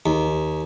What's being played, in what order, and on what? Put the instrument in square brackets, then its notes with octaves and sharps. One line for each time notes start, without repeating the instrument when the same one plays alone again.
[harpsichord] D#2